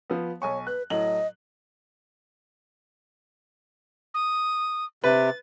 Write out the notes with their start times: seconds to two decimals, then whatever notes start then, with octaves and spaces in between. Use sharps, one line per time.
0.10 F3 B3
0.42 B1 C#5 G#5 C#6
0.67 B4 F#6
0.90 A2 F#3 D#5 F#7
4.14 D#6
5.04 C3 B4 A6